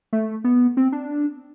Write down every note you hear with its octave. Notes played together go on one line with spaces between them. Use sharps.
A3
B3
C4
D4